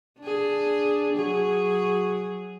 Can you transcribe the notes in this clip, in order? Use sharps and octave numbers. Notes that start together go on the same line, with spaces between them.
D4 G#4
F#3 G#4